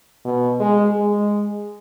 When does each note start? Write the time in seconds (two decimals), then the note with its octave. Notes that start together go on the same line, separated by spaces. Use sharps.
0.25 B2
0.60 G#3
0.95 G#3